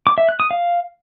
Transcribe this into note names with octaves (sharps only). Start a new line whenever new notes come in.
D6
E5
F#6
D#6
F5